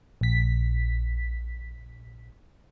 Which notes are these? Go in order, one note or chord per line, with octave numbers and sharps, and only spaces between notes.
A#1 B6